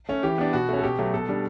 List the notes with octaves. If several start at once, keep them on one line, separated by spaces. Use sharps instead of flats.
A3 C#4
E3 G4
B3 D4
B2 F#4
A3 C#4
A4
B2 G4
F#3 A3
B2 A4
G3 D4